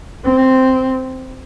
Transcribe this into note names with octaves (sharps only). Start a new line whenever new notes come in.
C4